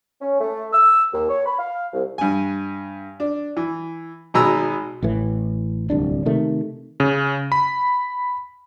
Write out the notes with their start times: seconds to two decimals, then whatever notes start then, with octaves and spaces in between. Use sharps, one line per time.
0.21 C#4
0.41 A3
0.73 E6
1.14 D#2
1.29 C#5
1.46 B5
1.59 F5
1.93 C2
2.18 G2 G#5
3.20 D4
3.57 E3
4.34 G#1 B2 G#4 A#5 E6
5.03 A1 A2 E3
5.90 D1 C2 D4
6.26 C3 D#3 A3
7.00 C#3
7.52 B5